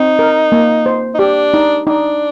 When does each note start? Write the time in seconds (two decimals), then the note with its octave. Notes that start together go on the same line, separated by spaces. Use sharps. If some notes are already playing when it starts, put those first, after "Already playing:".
Already playing: C4 D#4
0.19 A#4
0.52 A#3
0.86 C5
1.15 D#4
1.19 D4 G4
1.54 D#4
1.87 D4 D#4